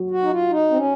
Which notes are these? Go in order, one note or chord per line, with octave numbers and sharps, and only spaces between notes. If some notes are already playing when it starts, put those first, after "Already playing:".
Already playing: F#3
F#4
D#4
F4
D#4
C4
C#4